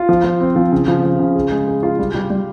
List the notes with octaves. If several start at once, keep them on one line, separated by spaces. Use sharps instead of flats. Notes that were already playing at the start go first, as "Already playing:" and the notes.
Already playing: F4
F3
F3
C4
F3
C#3
F3
F3
C#3
G#4
G#3
G#4
F4
G3
G3
G3